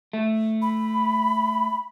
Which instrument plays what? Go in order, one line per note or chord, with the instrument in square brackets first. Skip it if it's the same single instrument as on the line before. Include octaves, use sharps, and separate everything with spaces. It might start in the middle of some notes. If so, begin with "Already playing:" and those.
[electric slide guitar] A3
[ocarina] B5